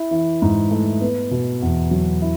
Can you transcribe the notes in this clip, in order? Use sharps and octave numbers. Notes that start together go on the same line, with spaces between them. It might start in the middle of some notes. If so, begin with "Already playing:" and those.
Already playing: E4
E3
G#2
A3
B3
B2
E2
F#3
E4